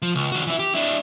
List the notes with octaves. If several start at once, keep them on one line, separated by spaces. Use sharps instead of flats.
F3
C#2
D#3 F#4
E3 E4
G4
D4 E4